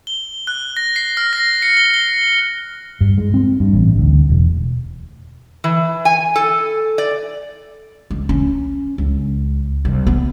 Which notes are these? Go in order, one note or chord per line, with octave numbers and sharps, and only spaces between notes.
G7
F#6
A#6
C7
F6
A#6
C#7
G7
G7
G2
G#3
C4
G2
A1
D2
E1
E3
G#5
A4
D5
C#2
C#4
C#2
C2
B3